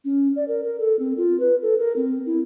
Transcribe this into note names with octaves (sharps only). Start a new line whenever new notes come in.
C#4
D5
A#4
A#4
A4
C4
F4
B4
A4
A#4
C4
E4